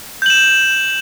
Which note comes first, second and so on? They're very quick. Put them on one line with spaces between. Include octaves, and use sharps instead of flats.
G6 F#7 E7